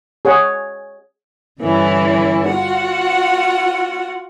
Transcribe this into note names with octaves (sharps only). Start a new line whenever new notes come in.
G#4 C#5 F#5
G2 D3 E3 C#4 E4
F4 F#4 F#5